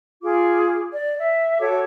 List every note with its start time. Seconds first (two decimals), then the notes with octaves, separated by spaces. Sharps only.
0.23 F4 G#4 D6
0.92 D5
1.18 E5
1.60 F#4 A4 C#5 D6